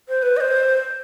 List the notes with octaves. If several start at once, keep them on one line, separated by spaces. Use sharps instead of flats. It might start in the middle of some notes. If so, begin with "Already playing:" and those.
C5
B4
D#5
C5